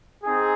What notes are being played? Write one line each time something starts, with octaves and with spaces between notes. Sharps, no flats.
C4 D#4 G#4